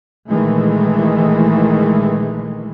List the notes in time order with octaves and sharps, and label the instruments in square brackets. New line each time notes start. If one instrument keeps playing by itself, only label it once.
[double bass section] A#1 D#3 E3 G#3 A3